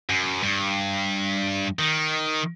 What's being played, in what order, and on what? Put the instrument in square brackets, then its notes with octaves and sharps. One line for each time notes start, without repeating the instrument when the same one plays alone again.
[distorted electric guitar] F#2
G2
D#3